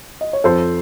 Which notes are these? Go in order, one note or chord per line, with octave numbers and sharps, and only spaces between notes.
D#5
C#5
F2 A4 C5